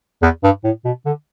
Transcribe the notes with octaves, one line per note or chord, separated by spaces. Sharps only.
E2
G2
A2
B2
D3